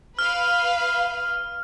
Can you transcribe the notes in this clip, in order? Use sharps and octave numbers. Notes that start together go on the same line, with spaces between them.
B4 F5 F6